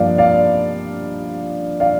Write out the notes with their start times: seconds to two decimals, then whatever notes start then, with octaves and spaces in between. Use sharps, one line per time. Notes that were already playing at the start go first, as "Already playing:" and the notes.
Already playing: G2 F3 A#3 D4 D5 F5
0.18 D5 F5
1.80 D5 F5